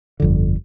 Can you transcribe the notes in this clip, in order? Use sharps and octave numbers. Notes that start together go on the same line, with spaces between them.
G1 F2 D3